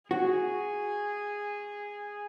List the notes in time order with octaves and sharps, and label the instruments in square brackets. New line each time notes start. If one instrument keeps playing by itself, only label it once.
[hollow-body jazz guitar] F#4 [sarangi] G#4